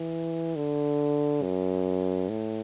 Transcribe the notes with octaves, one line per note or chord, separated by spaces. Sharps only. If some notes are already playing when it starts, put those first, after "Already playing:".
Already playing: E3
D3
F#2
A2